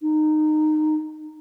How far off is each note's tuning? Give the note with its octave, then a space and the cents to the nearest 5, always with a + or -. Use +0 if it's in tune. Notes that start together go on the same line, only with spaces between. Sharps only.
D#4 -20